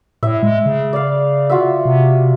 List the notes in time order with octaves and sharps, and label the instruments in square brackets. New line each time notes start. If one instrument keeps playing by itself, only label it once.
[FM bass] A2 [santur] E5
[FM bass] G#3
C#3
[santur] D5 F5
F4 F#4 E5
[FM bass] C3